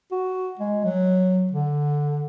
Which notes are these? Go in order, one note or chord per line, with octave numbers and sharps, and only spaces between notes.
F#4
G#3
F#3
D3